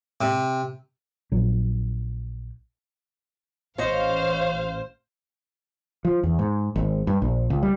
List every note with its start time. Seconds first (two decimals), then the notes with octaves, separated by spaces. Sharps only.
0.21 C3
1.32 A#1 F#3
3.78 A1 C5 C#5 D#5 F5
6.05 F3
6.23 E2
6.39 G#2
6.76 G#1
7.07 G2
7.22 A#1
7.50 C#2
7.63 G3